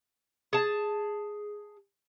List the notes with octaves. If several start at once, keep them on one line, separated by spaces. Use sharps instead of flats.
G#4 A5